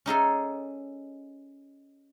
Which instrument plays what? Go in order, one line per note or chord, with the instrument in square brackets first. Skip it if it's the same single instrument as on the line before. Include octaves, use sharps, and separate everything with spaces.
[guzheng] C#4 D#4 G#4 A4